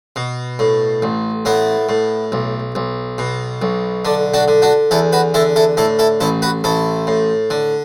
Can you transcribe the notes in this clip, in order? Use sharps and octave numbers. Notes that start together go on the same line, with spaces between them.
B2
A2
A1
A2 B3 E4
A2
B1
B1
B2
B1
D3 D4
D4 F#4
D3
D4 F#4
E2 E4 A4
F#4 B4
D3 E4 A4
E4 A4
A2 E4 A4
E4 A4
A1 E4 A4
F#4 B4
A1 E4 A4
A2
D3